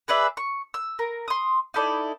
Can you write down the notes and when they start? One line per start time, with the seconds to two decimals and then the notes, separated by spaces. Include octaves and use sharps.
0.08 G#4 B4 D5 E5
0.37 C#6
0.74 E6
0.99 A#4
1.28 C6 D#6
1.74 D#4 E4 A4 D5